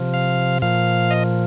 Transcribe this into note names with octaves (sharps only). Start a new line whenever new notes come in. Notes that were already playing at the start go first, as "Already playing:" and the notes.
Already playing: C3 F3
F5
A#2 F3 F5
D#5